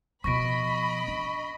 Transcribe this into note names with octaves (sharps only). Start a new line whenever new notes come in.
B2 F3 D#5 B5 C#6 A#6 D7
D4